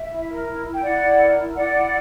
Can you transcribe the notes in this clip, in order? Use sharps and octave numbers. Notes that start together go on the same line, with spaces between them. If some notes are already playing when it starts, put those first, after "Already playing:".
Already playing: E5
E4
A#4
E4
E4
G5
E4 D5 F#5
E4
A#4
E4
E4 D5 F#5
E4